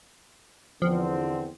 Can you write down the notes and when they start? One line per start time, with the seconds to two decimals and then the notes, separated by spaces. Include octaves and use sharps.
0.82 E2 D3 F3 C4